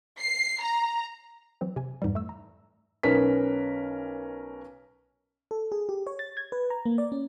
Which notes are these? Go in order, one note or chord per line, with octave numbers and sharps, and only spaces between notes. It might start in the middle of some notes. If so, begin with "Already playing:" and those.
C7
A#5
E3 F#3 C4 C5
C3 G#5
F2 G#2 E3 G3
A3 E6
A#5
B1 C#4 A#4 B4 B6
A4
G#4
G4
C#5
A6
G#6
B4
A#5
A#3
D5
C#4